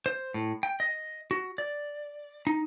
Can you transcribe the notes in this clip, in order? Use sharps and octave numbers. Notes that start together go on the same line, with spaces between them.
C5
A2
G5
D#5
F#4
D5
D#4